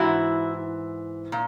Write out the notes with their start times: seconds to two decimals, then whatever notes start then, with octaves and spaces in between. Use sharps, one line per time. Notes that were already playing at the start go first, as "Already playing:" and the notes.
Already playing: G#2 E3 E4 F#4
1.32 A#2